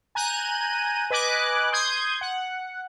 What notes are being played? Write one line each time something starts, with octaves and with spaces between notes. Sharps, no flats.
G#5 A#5 F#6 G6 D#7
B4 D#5 G#5 D6 F#6
C6 D#6 G6 G#6
F#5